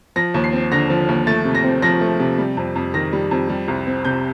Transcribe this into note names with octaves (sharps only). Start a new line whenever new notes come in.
F3 A#6
D#2
C7
C4
D3 A#6
F3
D#2
A3 A6
C3
A#6
C4
F3 A#6
A3
C3
G3
F2
F2
D#3 A#6
G3
F2
G3
C2
C4
C3 G6